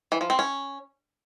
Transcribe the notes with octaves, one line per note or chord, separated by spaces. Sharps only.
E3
F3
C4
C#4